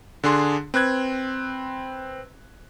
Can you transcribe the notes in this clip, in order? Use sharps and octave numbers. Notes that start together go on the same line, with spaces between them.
D3 D4 G#4 C6
C4 B4 F#6 G#6